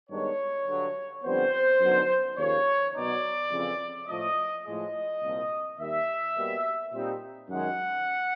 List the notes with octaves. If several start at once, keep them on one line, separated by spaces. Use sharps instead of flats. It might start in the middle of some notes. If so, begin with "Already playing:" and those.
G2 D#3 G#3 B3 D4 C#5
G2 D3 F#3
F2 D3 G3 B3 C5
F#2 D3 F#3 B3 D#4
D#2 C#3 F3 A#3 C#5
B2 F#3 B3 D#4 D5
F2 C#3 E3
A2 F3 A3 D#5
A2 F3 G#3 D#5
C2 A#2 F3
D#2 D#3 G3 A#3 E5
B2 G3 A#3
A#2 G3 C4 D#4
F#2 D#3 G#3 F#5